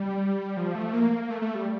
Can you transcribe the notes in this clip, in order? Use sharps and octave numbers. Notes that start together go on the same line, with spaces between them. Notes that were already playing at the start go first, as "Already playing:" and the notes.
Already playing: G3
F3
A3
A#3
A3
A3
G3